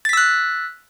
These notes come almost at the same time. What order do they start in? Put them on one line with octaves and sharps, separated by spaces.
A6 B6 E6 F#6